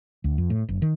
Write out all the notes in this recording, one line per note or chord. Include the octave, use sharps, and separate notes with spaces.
D2
F2
A2
F#1
D#3